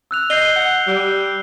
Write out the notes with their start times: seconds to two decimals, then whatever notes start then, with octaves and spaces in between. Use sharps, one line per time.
0.11 E6 F#6 F7
0.30 D#5 G6 C7 G7
0.56 F#5
0.87 G3